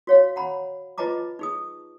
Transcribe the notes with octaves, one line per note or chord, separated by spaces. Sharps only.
F#4 C#5 F5
F#5 A#5 B5
F4 B4 D#5 A5 A#5 D6
D#4 G#4 D#6